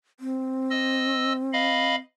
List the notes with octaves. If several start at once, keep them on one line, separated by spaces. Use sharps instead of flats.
C4
D#5 E6
D#5 F5 B5